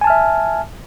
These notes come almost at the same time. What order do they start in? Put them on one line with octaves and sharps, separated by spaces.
G#5 A5 F6 E5